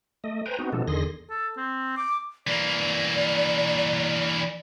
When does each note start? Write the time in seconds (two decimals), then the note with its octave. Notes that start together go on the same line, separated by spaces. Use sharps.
0.24 A3 D#5
0.46 B4 C5 G5 G#5 A#5
0.59 B3 C4 D#4 F#4
0.72 B2 F3 G#3 B3 D4 A4
0.87 E2 D3 D#3 G#4 C6 A#6
1.30 A4
1.57 C4
1.97 D6
2.47 E3 A#3 D5